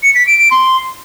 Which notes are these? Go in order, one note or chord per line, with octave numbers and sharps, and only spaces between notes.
C#7
B6
D7
D7
C6